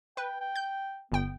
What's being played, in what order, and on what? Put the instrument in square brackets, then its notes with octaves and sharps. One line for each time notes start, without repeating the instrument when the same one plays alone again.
[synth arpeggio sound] B4 [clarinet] G5
[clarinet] G5
[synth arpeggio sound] G6
[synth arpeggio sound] G1 G5 [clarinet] B3